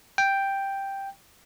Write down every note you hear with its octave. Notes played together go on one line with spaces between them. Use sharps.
G5